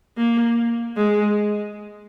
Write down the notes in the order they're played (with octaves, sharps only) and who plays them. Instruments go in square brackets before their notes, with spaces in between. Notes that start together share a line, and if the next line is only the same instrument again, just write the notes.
[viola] A#3
G#3